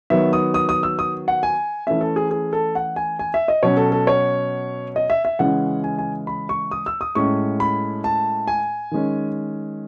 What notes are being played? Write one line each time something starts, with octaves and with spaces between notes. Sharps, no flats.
D#3 F#3 B3 E5
D#6
D#6
D#6
E6
D#6
F#5
G#5
E3 A3 C#4 E5
A4
G#4
G#4
A4
F#5
G#5
G#5
E5
D#5
B2 F#3 C#4 C#5
A4
A4
C#5
D#5
E5
E5
C#3 E3 G#3 C#4 F#5
G#5
G#5
B5
C#6
D#6
E6
D#6
A2 G#3 C#4 C#6
B5
A5
G#5
D#3 G#3 C#4